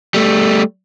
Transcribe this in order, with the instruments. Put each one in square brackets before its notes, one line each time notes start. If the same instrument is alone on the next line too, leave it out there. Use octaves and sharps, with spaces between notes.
[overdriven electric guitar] G3 A3